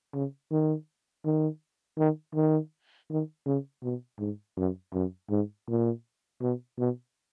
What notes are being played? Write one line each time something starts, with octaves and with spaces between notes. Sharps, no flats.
C#3
D#3
D#3
D#3
D#3
D#3
C#3
B2
G#2
F#2
F#2
G#2
A#2
B2
B2